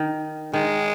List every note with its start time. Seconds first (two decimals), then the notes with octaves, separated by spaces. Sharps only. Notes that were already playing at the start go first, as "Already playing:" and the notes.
Already playing: D#3
0.53 D#3 G#3